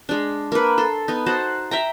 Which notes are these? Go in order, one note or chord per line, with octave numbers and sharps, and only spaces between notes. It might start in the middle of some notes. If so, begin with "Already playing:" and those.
G#3 D4
A#3 B4
A4 C6
B3 D#4
F#4 C5 F#5 A5
E5 G5 A#5